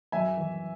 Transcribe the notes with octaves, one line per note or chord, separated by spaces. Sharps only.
F#2 E5 G#5
E3